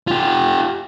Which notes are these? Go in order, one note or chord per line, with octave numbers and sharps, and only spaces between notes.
F4 G4